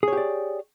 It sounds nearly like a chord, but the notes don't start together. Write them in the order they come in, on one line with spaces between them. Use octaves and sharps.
G#4 C#5 G4 D5